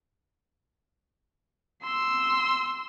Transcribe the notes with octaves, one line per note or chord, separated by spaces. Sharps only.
C6 E6